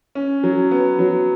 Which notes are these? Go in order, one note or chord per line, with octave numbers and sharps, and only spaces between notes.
C#4
F#3
B3
F#3